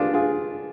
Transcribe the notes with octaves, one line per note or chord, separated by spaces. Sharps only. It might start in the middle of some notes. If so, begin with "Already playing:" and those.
Already playing: D4 F4 G4 G#4
F4 G#4